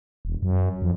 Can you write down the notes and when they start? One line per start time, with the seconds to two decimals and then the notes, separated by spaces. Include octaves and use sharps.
0.25 E1
0.43 F#2
0.82 F2